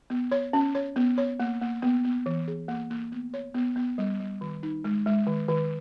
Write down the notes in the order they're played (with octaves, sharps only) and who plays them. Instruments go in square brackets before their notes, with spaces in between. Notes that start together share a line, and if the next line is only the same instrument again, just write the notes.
[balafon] B3
C#5
C#4
C#5
B3
C#5
A#3
A#3
B3
B3
E3
G#4
A#3
A#3
B3
C#5
B3
B3
G3
G3
D#3
D#4
G#3
G#3
D#3
D#3